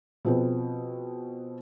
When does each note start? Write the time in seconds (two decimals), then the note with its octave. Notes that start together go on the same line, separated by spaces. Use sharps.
0.25 B2 F3 C4 G#4 B4